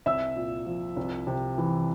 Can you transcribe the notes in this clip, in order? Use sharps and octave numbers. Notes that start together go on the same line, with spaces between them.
C2 E5 E6
A#2
F3
C2
C3
E3